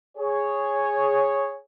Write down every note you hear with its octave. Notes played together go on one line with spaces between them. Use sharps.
G#4 C#5